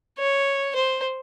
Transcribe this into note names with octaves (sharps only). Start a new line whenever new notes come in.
C#5
C5